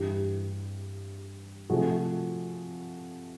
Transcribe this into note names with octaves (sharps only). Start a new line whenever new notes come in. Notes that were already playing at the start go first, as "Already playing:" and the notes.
Already playing: G2 E3 G3 G4
C3 F3 A3 F#4 G#4